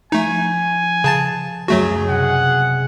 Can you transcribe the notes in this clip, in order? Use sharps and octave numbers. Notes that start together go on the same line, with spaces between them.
F3 A3 D#4 G#5
C#3 A5 A6
C#2 F#2 F#3 A3 F#4 G#4
C3 F#5